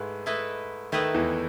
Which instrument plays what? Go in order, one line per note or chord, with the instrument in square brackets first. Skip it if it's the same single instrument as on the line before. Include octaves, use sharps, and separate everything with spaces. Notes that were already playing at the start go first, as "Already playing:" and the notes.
Already playing: [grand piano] G#2 G#3 [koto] A3 E4 B4
[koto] A3 E4 B4 D#5
[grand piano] D#3 [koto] A3 E4 B4 D#5
[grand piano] E2 E3